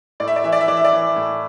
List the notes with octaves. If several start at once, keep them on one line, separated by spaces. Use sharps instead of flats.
A2 D5
E5
D5
E3 E5
D5
E5
E3 D5
E5
D5
E3
A2